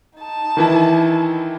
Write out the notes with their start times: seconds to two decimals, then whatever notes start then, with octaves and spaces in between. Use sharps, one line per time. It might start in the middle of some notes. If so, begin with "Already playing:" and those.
0.17 D#4 A5
0.57 D#3 E3 E4